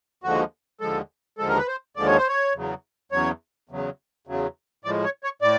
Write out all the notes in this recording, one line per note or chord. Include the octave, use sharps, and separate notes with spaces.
D#2 D3 F3 G#3 F#4
D#2 D3 F3 G#3 A4
D#2 D3 F3 G#3 A4
A#4
B4
C5
D#2 D3 F3 G#3 D5
C#5
C5
C#5
E2 C#3 F#3
E2 C#3 F#3 C#5
E2 C#3 F#3
E2 C#3 F#3
A2 F3 G#3 D5
C#5
C#5
A2 D5